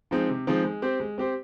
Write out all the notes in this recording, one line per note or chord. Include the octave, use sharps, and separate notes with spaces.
F3 G#3 C4 D#4
C3
F3 G#3 C4 D#4
G#3
C4 G4 C5
G#3
C4 G4 C5